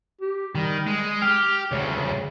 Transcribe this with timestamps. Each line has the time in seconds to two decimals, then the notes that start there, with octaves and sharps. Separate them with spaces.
0.21 G4
0.55 D#3 G3
0.86 G#3
1.22 G4 F6
1.72 D2 C#3 C#5